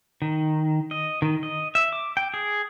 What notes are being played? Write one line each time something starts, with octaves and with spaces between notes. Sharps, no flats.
D#3
D#5
D#3
D#5
E5
D6
G5
G#4